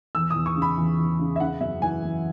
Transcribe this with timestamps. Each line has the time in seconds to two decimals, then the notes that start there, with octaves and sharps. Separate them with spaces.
0.15 E2 E6
0.30 E2 D#6
0.46 C#6
0.56 C#3
0.62 B5
0.77 E2
0.98 E2
1.19 C#3
1.36 E5
1.40 C#3 F#5
1.61 F#2 E5
1.82 E3 G#5
2.03 E3